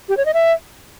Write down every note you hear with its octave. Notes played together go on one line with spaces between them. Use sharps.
G4
C#5
D#5
E5